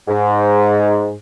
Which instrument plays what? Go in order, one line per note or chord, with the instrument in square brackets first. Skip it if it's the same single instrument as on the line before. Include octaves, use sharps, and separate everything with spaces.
[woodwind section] G#2